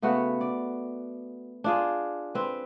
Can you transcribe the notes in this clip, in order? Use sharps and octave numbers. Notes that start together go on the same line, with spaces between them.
C#3 A3 B3 F#4
D5
D4 F4 G#4
C4 B4